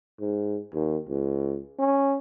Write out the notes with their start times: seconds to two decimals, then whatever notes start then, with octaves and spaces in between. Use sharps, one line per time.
0.20 G#2
0.73 D#2
1.09 C#2
1.79 C#4